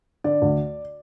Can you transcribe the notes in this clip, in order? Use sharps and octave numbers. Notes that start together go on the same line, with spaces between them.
D3 D5
D2